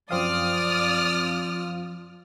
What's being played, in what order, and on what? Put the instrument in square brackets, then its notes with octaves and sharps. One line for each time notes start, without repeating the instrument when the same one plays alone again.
[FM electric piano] F#2 C4 F5 [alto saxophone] F3 [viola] D5 [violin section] D#6 F6